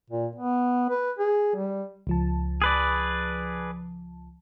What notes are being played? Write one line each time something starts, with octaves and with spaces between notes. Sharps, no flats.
A#2
B3
B4
G#4
G3
C#2 F3 A5
G#4 B4 D5